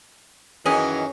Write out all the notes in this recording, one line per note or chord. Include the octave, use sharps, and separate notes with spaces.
F#2 D#3 E3 C#4 G#4 D#5 G#5